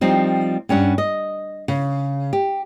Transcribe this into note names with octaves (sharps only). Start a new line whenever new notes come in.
F3 G3 C4 D#4
G2 C#4 D4 F#5
D#5
C#3
G4